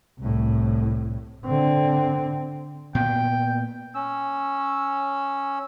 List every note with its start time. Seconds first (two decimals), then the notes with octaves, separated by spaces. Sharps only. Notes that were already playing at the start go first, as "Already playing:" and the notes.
0.19 C2 A2
1.45 D3 C4
2.95 A#2 B3 G5
3.95 C#4 E6